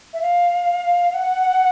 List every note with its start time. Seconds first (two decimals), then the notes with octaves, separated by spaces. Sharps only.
0.13 E5
0.22 F5
1.13 F#5